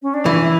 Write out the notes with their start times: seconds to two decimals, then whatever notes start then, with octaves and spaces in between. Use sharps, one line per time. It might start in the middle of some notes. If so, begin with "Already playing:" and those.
0.02 C#4
0.14 D4
0.26 E3 E4